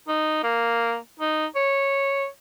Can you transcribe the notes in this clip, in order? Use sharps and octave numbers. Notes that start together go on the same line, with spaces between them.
D#4
A#3
D#4
C#5